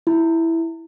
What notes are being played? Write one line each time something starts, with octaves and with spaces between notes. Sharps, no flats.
E4